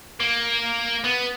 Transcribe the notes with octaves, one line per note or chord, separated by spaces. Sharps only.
A#3
B3